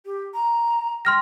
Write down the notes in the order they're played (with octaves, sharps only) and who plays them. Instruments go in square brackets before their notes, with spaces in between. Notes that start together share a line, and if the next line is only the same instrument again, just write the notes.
[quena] G4
A#5
[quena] G5 [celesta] C6 F6 A#6